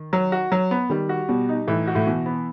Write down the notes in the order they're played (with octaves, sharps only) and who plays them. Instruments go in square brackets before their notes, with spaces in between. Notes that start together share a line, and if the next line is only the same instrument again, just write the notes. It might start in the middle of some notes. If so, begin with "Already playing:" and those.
Already playing: [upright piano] D#3
[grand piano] F#3
F#4
F#3
B3
[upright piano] D#3 [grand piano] G3
[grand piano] F#4
[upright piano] B2 [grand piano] G3
[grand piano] D#4
[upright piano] A2 [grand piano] E3
[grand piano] F#4
[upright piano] A2
[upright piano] B2 [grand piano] E3
[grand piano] B3